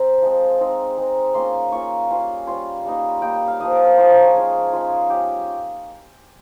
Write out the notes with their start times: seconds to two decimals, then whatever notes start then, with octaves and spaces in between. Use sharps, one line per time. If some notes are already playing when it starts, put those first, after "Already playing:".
Already playing: C4 A#5
0.22 F3 G#3 C4
0.60 G#3 C4 D#4
0.98 G#3 C4 D#4
1.34 A#3 C#4 F4 C6
1.72 A#3 C#4 F4 C#6
2.10 G3 C#4 F4
2.47 G3 C#4 F4 C6
2.85 G3 A#3 D#4
3.22 G3 A#3 D#4 G5
3.35 G5
3.48 F5
3.59 F3 A#3 D#4 D#5
3.72 A#4
3.85 A#4
3.97 F3 A#3 D#4 C5
4.10 C#5
4.22 G#4
4.35 G#3 C#4 F4
4.73 G#3 C#4 F4
5.10 G#3 C#4 F4 G4